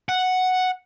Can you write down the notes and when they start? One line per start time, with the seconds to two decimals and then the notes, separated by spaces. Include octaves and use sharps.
0.09 F#5